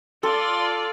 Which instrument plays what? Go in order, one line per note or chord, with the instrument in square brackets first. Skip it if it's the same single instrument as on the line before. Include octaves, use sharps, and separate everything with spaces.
[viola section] F4 D5 [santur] A4 [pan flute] C6